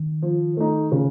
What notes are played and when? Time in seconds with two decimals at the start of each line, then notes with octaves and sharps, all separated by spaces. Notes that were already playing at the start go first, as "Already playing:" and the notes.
Already playing: D#3
0.22 F3
0.57 A3 D#4
0.92 C#3